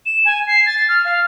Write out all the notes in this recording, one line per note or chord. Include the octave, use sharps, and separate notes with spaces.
E7
G#5
C7
A6
F6
F5